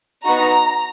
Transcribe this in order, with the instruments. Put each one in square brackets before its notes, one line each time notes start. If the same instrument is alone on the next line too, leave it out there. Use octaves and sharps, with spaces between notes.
[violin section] B3 D#4 F#4 A#5